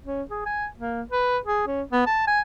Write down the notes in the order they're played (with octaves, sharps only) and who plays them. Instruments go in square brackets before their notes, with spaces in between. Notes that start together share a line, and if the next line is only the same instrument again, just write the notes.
[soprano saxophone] C#4
G#4
G#5
A#3
B4
G#4
C#4
B3
A5
G#5